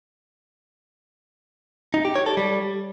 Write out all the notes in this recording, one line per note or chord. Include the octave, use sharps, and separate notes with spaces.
D#4
G4
C#5
A4
G3